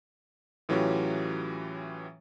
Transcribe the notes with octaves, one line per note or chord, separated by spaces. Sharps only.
A2 E3 F#3 C#4 F4 G4